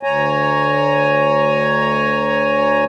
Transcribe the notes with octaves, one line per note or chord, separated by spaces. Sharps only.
D2 C#5 G#5 A#5